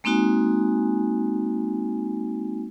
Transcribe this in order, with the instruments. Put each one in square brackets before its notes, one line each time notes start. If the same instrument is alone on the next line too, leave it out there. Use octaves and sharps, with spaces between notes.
[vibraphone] G#3 A#3 C4 D#4 F#4 G#5